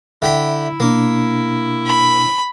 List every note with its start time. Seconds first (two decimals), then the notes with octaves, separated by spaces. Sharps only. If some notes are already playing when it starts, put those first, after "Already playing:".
0.22 D3 E4 E5 G5 B5
0.80 B2 A#3 D4
1.87 B5